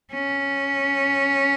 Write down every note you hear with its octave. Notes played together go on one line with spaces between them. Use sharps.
C#4